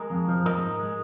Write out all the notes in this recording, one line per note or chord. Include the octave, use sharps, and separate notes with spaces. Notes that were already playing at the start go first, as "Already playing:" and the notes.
Already playing: G#3 A#4 D#5
F2
F3
G#2 A#4 D#5
G#2
G#3